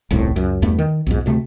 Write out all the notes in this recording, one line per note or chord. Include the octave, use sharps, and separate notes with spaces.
D#1 C2 F2 A2
C#2 F#2
E2 G2 A3 B3
D#3
B1 F2 G#2
D2 C3 A3 C4